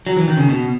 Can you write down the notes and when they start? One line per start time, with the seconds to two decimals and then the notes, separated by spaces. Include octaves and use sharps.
0.07 F#3
0.17 E3
0.28 D#3
0.37 C#3
0.49 B2